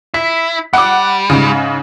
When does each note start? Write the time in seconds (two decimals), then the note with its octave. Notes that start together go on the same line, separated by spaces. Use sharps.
0.14 E4 B6
0.73 G3 F#5 D6
1.30 G#2 C#3